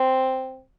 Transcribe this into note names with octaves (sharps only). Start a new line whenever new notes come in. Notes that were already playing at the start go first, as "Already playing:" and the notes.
Already playing: C4